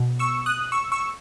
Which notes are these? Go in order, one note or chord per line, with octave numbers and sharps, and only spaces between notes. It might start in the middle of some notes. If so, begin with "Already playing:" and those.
Already playing: B2
C#6 E6
D#6 F#6
C#6 E6
C#6 E6